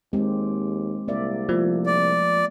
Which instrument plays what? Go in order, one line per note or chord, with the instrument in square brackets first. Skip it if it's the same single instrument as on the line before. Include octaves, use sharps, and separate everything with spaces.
[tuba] D#2 [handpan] G#3 C4 G4
[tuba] C2 [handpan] A#3 D5 E5
[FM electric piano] F3 [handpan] A3 A#3
[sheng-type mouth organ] D5